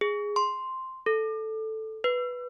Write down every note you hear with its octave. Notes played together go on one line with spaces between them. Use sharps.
G#4
C6
A4
B4